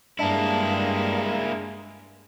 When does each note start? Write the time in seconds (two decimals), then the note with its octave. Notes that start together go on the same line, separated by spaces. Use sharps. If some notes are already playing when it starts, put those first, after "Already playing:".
0.19 G2 G#3 A#3 D4 E4 G#4